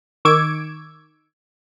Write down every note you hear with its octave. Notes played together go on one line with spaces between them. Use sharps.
D#3 C#6 D6 E6 G#6 D7